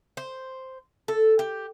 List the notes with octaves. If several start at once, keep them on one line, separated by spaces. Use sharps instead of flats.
C5
A4
G4